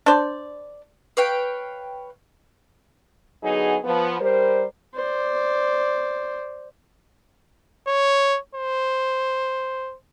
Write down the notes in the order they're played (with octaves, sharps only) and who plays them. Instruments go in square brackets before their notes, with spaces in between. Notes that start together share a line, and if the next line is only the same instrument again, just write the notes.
[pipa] D4 C5 D5
[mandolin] B4 C#5 F5 G5
[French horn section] D3 F#3 B3 D#4 G#4
F3 B3
G3 A#4 C5
[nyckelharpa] C5 D5
[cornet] C#5
C5